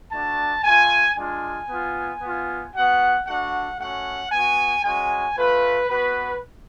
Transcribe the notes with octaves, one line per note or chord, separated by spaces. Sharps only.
A3 D4 F#4 A5
A3 F4 G#5
G#3 D4 F4 G#5
B3 F4
B3 F4
B3 F#4 F#5
A3 D4 F#4 F#5
A3 C#4 F#4 F#5
B3 F#4 G#5
G#3 C#4 F#4 G#5
A3 F4 B4
B3 F#4 B4